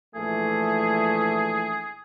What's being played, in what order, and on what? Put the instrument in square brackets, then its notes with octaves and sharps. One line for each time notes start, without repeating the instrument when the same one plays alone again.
[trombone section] A#1 E3 A3 [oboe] G#4